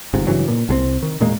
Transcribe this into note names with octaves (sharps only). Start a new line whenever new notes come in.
G1 G#2 C3
G2 C#3 E3 F#3
A#2
C2 G#3 C4
D#3
E1 A#2 G#3 A#3